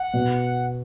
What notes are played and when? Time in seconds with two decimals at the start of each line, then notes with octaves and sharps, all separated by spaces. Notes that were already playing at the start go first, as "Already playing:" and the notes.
Already playing: F#5
0.14 B2